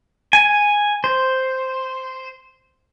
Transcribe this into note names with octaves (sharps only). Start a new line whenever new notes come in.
G#5
C5